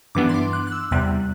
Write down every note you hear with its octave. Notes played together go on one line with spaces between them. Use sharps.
G2 E3 B3 D4 D6
C6
D6
F#6
F#6
E6
E2 C3 G3 F#6